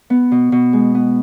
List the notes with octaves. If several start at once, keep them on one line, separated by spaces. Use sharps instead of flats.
B3
B2
B2
G#3
B3